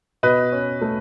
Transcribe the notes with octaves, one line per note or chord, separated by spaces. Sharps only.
B2 B4 D#5
C#4
A3